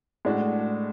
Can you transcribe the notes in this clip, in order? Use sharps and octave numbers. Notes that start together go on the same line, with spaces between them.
A2 G#3 D4 F#4